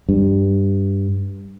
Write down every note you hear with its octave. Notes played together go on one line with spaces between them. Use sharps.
G2